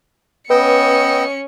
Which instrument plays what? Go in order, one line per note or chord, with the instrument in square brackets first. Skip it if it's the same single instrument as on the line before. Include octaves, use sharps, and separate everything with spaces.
[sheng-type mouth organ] B3 E6 [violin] C#4 C#7 [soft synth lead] B4 [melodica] D#5 G5